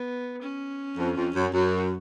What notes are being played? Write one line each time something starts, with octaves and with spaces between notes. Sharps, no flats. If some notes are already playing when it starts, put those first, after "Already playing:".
Already playing: B3
C#4
F2
F2
F#2
F#2 F#4